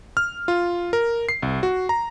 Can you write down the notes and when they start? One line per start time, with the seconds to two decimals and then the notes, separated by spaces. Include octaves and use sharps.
0.17 F6
0.48 F4
0.93 A#4
1.29 C7
1.43 C2
1.63 F#4
1.89 A#5